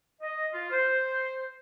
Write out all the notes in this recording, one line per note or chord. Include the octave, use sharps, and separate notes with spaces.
D#5
F4
C5